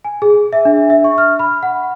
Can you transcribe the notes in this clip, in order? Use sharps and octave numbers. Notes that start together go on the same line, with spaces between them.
G#5
G#4
E5
D4
E5
C#6
F6
B5
F#5